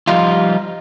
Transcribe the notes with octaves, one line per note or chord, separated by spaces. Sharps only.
F3 G3 D#4 F4